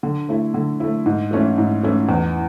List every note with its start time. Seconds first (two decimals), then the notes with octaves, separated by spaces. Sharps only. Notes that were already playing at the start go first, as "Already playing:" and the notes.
0.03 D3
0.29 A3 E4
0.54 D3
0.80 A3 E4
1.06 G#2
1.31 E3 A3 C#4 E4
1.58 G#2
1.83 E3 A3 C#4 E4
2.09 E2